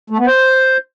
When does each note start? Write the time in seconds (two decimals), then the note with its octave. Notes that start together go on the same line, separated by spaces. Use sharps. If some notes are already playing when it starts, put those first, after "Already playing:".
0.10 A3
0.19 B3
0.27 C5